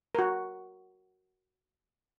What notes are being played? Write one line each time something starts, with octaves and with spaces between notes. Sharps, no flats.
F#4 A#4